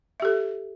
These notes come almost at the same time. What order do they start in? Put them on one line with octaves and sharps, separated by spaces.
E5 G4 A4